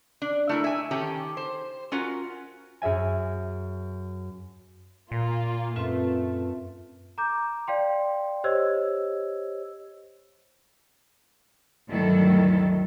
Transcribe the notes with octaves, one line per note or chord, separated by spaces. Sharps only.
D4
A3 E4 A#4
E5 G#5
D#3 C#4 G4 A4
C5
C#4 F4 F#4 A#4
F#2 G#4 E5 G#5
A#2 A#3 F4
F#2 A3 C4 F4 B4
A#5 D6 G6
D5 F5 G5 C6
G4 C5 C#5 D#5 E6 G#6
D2 G2 D#3 F#3 E4 A4